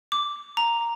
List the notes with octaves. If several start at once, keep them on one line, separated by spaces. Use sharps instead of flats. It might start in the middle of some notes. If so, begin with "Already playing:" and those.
D6
A#5